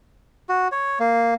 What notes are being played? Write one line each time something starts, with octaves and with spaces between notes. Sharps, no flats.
F#4
C#5
A#3